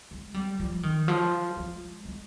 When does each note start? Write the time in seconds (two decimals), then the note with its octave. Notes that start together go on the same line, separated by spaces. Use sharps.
0.11 G#3
0.34 G3
0.60 F3
0.83 D#3
1.08 F3
1.57 G#3
2.05 G#3